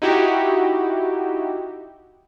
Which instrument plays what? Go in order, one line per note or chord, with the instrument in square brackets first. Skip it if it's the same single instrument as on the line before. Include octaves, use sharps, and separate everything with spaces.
[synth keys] D#4 E4 F#4 G4